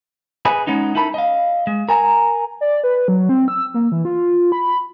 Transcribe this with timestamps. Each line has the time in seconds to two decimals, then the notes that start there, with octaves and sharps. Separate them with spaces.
0.45 G#4 B4 D#5 G#5 B5
0.67 G#3 B3 C#4 D#4
0.95 D#4 E4 A4 A#4 B5
1.14 D#5 F5
1.67 G#3
1.89 A#4 G#5 A#5
2.61 D5
2.84 B4
3.08 F#3
3.29 C4
3.48 E6
3.74 A#3
3.92 E3
4.05 F4
4.52 B5